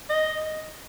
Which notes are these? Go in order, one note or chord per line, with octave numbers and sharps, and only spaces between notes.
D#5